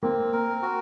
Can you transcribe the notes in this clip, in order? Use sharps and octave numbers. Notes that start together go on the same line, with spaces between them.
A#3 C4
A#4
F#4